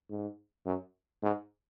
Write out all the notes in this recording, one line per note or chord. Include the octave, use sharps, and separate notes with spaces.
G#2
F#2
G#2